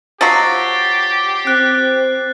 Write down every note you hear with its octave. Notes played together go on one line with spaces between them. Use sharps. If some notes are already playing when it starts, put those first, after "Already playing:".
F3 F#3 F#4 G4 A6 C7
C4 F#6